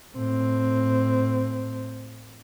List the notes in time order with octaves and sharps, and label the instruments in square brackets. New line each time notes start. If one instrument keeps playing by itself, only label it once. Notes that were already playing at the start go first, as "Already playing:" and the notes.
[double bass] A2 C4